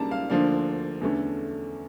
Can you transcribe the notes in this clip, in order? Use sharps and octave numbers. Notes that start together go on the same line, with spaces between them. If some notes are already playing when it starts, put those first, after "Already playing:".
Already playing: C#2 C#3 G3 A#3 D4 A5 A#5
F5
D2 D3 F3 A#3 D4 F5
E2 D3 A3 C#4